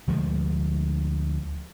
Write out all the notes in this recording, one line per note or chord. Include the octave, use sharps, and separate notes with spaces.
D2 F3 G#3 A3